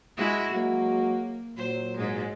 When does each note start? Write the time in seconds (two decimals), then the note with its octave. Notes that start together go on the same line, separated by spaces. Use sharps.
0.17 G#3 E4 F#4
0.52 F#3 G#3 A#3 F#4
1.57 A#2 F#3 C5
1.98 G#2 G#3